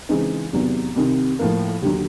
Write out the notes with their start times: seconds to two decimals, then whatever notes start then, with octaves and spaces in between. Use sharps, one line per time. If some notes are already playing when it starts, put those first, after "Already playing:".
0.09 C#3 E3 G#3 C4 D#4
0.53 E2 C3 D#3 F#3 B3
0.96 C2 C3 D#3
1.39 A2 F3 A#3
1.82 D#2 D3 F#3